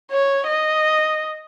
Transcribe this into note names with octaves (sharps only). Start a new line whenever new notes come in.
C#5
D#5